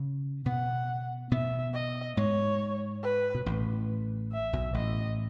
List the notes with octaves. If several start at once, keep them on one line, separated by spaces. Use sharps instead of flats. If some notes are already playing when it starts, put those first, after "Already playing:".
Already playing: C#3 C#4
B2 B3 F#5
B2 B3 E5
D#5
G#2 G#3 C#5
B4
B2
A1 A2
E5
B1 B2
A1 A2 D#5